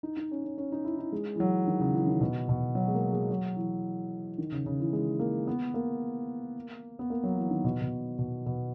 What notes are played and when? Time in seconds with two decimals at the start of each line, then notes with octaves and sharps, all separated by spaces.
0.03 D#4
0.17 D#4
0.31 C#4
0.45 C#4
0.58 C#4
0.72 D#4
0.85 E4
0.99 D#4
1.12 G#3
1.36 E3
1.40 F#3
1.67 D#3
1.80 C#3
1.94 E3
2.07 D#3
2.21 B2
2.49 B2
2.75 F#3
2.88 G#3
2.94 A#3
3.12 G#3
3.30 F#3
3.56 E3
4.38 D#3
4.52 C#3
4.66 C#3
4.80 E3
4.93 G#3
5.19 A#3
5.47 B3
5.74 A#3
6.99 B3
7.10 A#3
7.23 F#3
7.37 E3
7.51 D#3
7.64 B2
7.82 B2
8.19 B2
8.46 B2